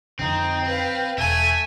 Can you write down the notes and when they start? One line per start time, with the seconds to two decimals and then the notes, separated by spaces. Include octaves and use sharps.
0.19 F2 D3 C4 D#4
0.64 B4 F5
1.18 E1 A3 E5 G#5